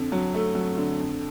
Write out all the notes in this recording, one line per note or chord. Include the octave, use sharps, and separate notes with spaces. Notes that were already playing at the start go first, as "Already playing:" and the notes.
Already playing: F2 D3
F#3
A3
F#3
D3
F2